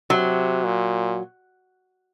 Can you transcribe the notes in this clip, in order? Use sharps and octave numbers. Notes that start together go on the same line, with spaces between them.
C3 F#3
A#2